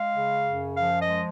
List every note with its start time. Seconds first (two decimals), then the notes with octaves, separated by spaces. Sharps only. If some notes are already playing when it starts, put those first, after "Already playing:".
Already playing: G#3 F5
0.15 C#3
0.46 F#2
0.77 F3 F5
1.01 D#5
1.08 G#3